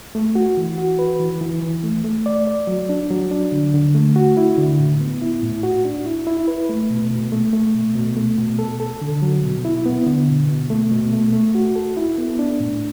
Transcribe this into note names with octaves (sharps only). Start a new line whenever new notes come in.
A3
F#4
E3
F#4
B4
E3
E3
E3
A3
A3
D5
D5
F#3
D4
F#3
D4
D3
D3
A3
F#4
E4
D3
A2
B3
E4
A2
F#4
D4
E4
E4
B4
A3
B2
B2
A3
A3
B2
B2
A3
B2
A4
A4
D3
F#3
B2
E4
B3
D3
B2
B2
A3
B2
A3
A3
F#4
A4
E4
B3
D4
A2